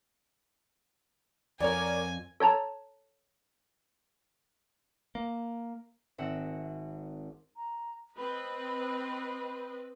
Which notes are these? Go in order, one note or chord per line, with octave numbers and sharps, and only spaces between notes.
F2 A#4 C#5 D5 G#5
A4 C#5 A5 A#5
A#3
G#1 C4 E5 F#5 A#6
A#5
C4 B4 D#5 B5